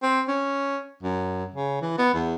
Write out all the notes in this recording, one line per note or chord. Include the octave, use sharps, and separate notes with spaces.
C4
C#4
F#2
C#3
E3
B3
E2